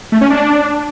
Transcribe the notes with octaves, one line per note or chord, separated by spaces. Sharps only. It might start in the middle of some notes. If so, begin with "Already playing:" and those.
A3
C#4
D4